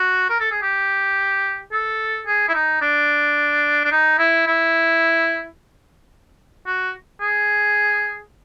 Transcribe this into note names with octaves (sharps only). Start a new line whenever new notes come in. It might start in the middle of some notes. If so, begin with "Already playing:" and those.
Already playing: F#4
A#4
A4
G#4
G4
A4
G#4
E4
D#4
D4
D4
D#4
E4
E4
F#4
G#4